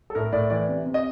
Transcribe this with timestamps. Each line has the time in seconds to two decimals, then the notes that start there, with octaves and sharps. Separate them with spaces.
0.10 A4
0.15 A2 A#4
0.32 A2 D5
0.50 E3 D5
0.69 C3
0.86 C3
0.94 D#5